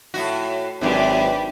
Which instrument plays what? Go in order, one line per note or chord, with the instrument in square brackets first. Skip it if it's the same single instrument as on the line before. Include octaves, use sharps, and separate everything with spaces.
[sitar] A2 C3 F#4
[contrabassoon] G#1 [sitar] F#2 C3 [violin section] D4 G4 B4